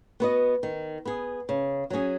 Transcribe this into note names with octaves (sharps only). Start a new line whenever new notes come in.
B3 F#4 B4 D#5
D#3
B3 G#4
C#3
F#3 C#4 G#4